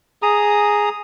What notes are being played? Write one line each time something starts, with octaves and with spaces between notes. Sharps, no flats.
G#4 A#5 D#6